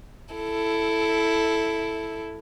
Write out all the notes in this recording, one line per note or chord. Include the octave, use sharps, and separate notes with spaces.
E4 A4